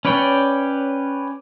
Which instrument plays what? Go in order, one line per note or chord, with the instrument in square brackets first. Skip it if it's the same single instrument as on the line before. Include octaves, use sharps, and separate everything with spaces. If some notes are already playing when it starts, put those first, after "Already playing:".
[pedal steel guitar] C#4 B4 C#5 D5 G5